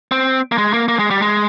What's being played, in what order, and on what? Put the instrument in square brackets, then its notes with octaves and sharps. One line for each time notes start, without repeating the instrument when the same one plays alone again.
[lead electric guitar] C4
A#3
G#3
A#3
A#3
G#3
G3
G#3